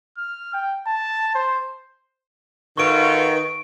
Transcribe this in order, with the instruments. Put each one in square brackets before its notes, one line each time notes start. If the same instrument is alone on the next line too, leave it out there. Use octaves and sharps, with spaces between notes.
[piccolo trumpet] F6
G5
A5
C5
[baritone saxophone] D#3 [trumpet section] F4 F#4 A4 [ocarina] B4 [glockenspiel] C#6 D7